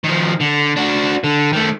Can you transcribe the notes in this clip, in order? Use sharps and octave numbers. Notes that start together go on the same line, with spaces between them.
D#3 F3
D3
D4 F#4
D3
D#3 A3